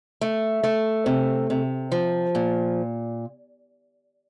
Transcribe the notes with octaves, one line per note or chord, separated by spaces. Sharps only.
A3
A3
C3
C3
F3
A#2